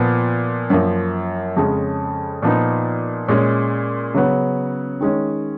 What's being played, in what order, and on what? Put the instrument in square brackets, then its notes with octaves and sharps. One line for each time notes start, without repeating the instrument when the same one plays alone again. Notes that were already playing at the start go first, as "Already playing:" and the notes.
Already playing: [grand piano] A#2 F3 B3
F#2 F3 A#3
F2 C#3 G#3 C#4
A#2 F3 B3 D#4
A#2 G#3 C#4
C#3 F#3 B3
D#3 G#3 C#4